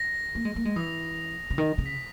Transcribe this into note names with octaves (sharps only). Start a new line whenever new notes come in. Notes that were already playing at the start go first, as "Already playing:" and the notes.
Already playing: A#6
A#3
G#3
A#3
G#3
E3 D#6
C#3
D#3
C#3
B6